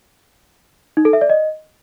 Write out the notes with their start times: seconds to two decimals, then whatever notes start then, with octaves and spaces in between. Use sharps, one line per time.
0.97 D#4
1.05 A4
1.13 E5
1.21 D5
1.30 D#5